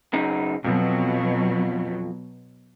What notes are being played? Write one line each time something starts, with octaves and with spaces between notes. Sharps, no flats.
F#2 C#3 D#4
F2 B2 F#3